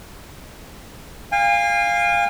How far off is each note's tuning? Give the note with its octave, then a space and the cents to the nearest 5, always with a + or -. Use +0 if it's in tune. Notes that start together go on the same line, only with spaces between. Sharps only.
F5 +0 G#5 -40